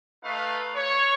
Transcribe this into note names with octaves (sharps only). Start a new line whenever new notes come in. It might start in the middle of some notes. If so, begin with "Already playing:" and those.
A3 D#4 B4 F5
C#5